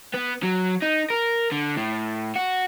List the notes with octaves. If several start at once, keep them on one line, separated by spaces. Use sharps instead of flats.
B3
F#3
D#4
A#4
D3
A2
F#4